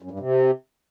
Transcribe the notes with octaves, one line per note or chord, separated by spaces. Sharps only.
F#2
G2
C3